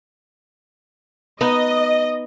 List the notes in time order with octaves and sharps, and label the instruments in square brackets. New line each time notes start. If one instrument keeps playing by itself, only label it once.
[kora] B3 D#4 [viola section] D#5